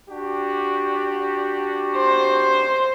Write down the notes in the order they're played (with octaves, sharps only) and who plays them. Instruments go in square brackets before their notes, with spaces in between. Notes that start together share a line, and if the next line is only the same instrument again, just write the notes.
[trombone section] D4 F#4 G4
[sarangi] C5